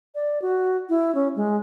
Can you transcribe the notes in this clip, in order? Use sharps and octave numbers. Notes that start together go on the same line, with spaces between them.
D5
F#4
E4
C#4
G#3